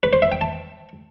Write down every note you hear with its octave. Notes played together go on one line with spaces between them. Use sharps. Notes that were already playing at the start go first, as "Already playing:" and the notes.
B4
C5
E5
G5
A5